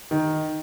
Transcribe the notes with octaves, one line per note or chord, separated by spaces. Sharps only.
D#3